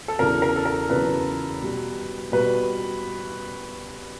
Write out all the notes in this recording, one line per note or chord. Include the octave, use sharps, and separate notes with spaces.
A4
E2 C#3 F#3 A#4
A#4
A4
A#4
E2 C#3 F#3 B4
B2 G3
B2 G3 B4